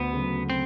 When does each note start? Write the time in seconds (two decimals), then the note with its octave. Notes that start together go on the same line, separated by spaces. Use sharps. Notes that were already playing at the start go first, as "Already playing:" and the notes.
Already playing: D2 B3
0.13 C#3 F#3
0.50 C4